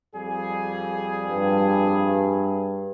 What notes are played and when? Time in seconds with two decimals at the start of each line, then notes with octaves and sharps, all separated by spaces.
0.13 F2 G3 G#4
1.29 G2